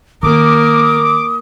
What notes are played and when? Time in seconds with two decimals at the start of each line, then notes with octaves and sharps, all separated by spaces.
0.23 D#3 A#3 C#4 A#4 D6 D#6